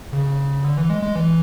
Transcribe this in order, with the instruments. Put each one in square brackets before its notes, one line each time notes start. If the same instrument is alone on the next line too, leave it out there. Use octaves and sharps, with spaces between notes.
[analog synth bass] C#3
D3
E3
G#3
G#3
E3